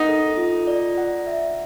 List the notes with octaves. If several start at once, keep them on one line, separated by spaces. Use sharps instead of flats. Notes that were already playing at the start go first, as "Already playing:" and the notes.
Already playing: D#4 F#5
A4
F4
D5
F#5
E5